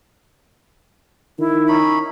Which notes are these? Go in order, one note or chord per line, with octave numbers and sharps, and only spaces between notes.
D#3 E4
C#4 D#4 B5